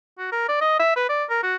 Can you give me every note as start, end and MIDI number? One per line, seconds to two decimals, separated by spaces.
0.18 0.32 66
0.32 0.45 70
0.49 0.57 74
0.61 0.78 75
0.79 0.96 76
0.96 1.04 71
1.09 1.24 74
1.30 1.40 70
1.43 1.56 66